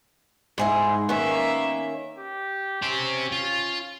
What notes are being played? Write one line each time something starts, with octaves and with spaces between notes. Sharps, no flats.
G#2 E4 G#4 C5
D#3 A#3 B3 C#4 E5
G4
C#4 G4 C5
F4